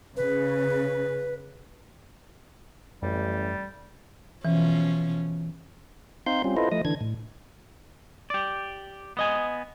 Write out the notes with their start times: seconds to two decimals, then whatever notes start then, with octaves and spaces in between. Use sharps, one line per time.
0.17 C#3 B4
3.02 A1 F#2 G3
4.45 B2 E3 F3 C#4
6.26 C4 D#4 F5 C6 G6
6.44 G3 C4 C#4 F4
6.57 E4 F4 A4 B4 C5 D#5
6.72 F3 A3 D#5 D#6
6.85 D3 E3 D4 G#6
7.01 A2
8.30 G4 D5
9.17 B3 D#5 G#5